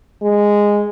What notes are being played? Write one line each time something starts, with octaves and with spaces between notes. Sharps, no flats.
G#3